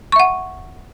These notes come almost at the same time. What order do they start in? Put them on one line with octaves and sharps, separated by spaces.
C#6 E5 F#5